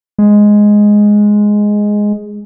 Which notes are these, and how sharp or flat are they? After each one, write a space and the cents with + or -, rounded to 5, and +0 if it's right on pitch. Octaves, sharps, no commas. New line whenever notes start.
G#3 +0